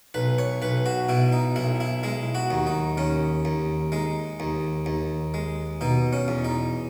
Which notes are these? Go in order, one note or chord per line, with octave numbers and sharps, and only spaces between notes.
B1 B4
C#5
B1 B4
F#4
B2 E4
D#4
B1 E4
E4
G#3 E4
F#4
D#2
D#4
D#2 C#4
D#2
G#3 D#4
D#2
D#2
G#3
B2 D#4
C#4
E2
D#4